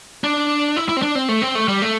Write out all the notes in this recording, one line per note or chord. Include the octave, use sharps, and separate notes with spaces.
D4
E4
E4
C4
D4
C4
A3
C4
A3
G3
A3